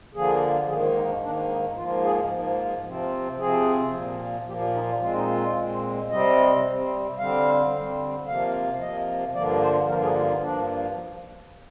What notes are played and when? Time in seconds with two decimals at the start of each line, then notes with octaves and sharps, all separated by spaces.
0.14 D3 F3 A#3 G#4
0.68 G#2 D#3 A#3 G#4
0.82 F4
0.95 D#4
1.09 D4
1.22 G#2 D#3 A#3 D4
1.49 D#4
1.76 G#2 F3 A#3 F4
2.04 G#4
2.31 G#2 F3 A#3
2.85 C3 F3 C4
3.39 C3 F3 C4 G#4
3.93 A#2 F3 A#3
4.48 A#2 F3 A#3 G4
4.61 G4
4.75 D#4
4.89 F4
5.01 A#2 G#3 C4 F4
5.13 D#4
5.26 F4
5.56 A#2 G#3 C4
6.10 C3 G3 C4 D#5
6.65 C3 G3 C4
7.18 D3 G3 C4 F5
7.73 D3 G3 C4
8.26 C3 F3 A#3 F5
8.80 C3 F3 A#3 D#5
9.34 G2 D3 F3 A#3 D5
9.62 C5
9.89 G2 D3 F3 A#3 A#4
10.03 G#4
10.17 F4
10.30 D#4
10.43 G2 F3 A#3 D4